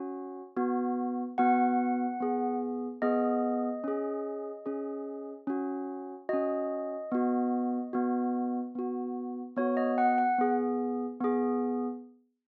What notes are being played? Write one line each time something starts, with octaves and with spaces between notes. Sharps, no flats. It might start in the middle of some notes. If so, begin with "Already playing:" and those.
Already playing: C#4 F#4
B3 F#4
B3 F#4 F#5
B3 G#4
B3 G#4 D#5
C#4 G#4
C#4 G#4
C#4 F#4
C#4 F#4 D#5
B3 F#4
B3 F#4
B3 F#4
B3 F#4 C#5
D#5
F#5
F#5
B3 G#4
B3 G#4